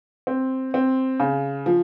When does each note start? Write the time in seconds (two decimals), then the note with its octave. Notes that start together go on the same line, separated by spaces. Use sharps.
0.27 C4
0.74 C4
1.20 C#3
1.66 F3